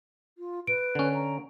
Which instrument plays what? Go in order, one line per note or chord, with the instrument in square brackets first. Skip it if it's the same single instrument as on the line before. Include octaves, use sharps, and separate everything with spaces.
[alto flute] F4
[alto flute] B4 [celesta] D7
[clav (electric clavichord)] D3 C#4
[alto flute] A#5